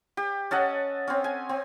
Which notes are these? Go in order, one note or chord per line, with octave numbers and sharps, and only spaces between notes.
G4
C#4 A4 D#5 F#5
C4 C#4
G#5
C4